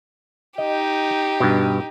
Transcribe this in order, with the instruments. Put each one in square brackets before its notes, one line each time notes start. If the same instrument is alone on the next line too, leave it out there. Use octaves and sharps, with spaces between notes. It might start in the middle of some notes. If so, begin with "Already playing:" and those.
[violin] D#4 G4 [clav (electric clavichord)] D#5
[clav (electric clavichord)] G2 B2